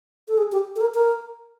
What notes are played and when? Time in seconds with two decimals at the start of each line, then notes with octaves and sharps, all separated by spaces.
0.28 A4
0.38 G#4
0.52 G4
0.76 A4
0.81 A#4
0.95 A#4